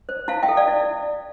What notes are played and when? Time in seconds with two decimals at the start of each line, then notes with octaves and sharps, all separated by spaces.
0.09 C5
0.28 E4 F5 A5
0.43 E5 G5
0.48 A4
0.57 D5 F5
0.68 E4